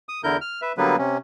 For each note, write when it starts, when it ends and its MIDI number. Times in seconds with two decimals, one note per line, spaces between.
0.09 0.21 87
0.24 0.37 40
0.24 0.37 50
0.24 0.37 64
0.24 0.37 70
0.24 0.37 91
0.41 0.61 89
0.62 0.72 71
0.62 0.72 76
0.78 0.96 50
0.78 0.96 54
0.78 0.96 55
0.78 0.96 58
0.78 0.96 59
0.78 0.96 71
0.98 1.17 48
0.98 1.17 61